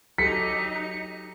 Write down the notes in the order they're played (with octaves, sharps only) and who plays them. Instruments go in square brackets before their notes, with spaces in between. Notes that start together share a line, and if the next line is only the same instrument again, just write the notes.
[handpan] F#3 G4 A4 [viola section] D#4 [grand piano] B6 [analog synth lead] C#7